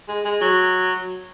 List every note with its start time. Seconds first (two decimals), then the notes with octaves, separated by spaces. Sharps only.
0.08 G#3
0.24 G#3
0.41 F#3